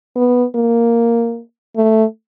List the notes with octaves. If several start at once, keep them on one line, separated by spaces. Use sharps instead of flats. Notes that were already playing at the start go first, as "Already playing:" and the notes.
B3
A#3
A3